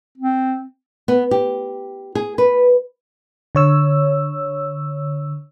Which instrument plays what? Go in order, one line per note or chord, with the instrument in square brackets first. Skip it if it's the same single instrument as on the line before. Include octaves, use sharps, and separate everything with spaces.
[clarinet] C4
[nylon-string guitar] B3
G4
G#4
B4
[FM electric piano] D3 C#5 E6